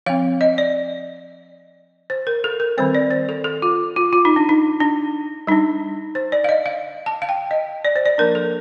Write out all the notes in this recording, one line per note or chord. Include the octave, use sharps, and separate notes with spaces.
F3 C4 F5
D#5
D5
C5
A#4
A4
A#4
D#3 G3 C4 C5
D5
C5
A4
A4
F4
F4
F4
D#4
D4
D#4
D4
G3 D4 D#4
C5
D5
F5
D#5
F5
A5
F5
G5
D#5
D5
C5
D5
F3 A#3 D4 A#4
A4